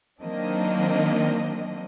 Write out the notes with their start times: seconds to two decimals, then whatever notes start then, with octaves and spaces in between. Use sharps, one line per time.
0.21 D#3 F#3 A#3 C4 D4 D#5